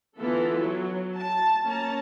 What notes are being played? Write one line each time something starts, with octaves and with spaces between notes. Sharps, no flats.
D3 E3 B3 E4 F4 A4
F#3
A5
A#3 C#4 C#5 A5 A#5